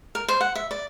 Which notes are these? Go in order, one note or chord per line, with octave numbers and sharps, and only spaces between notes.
A#4
C5
F#5
E5
D5